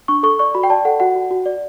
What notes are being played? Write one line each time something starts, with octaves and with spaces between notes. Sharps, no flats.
D4 C#6
A4 C#6
D5 C#6
F#4 B5
G5
D5 A5
A4 F#5
F#4 F#5
F#4
F#4
D5